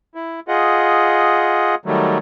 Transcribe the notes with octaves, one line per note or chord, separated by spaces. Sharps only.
E4
F4 G#4 D#5 F#5
D#3 F#3 G3 A3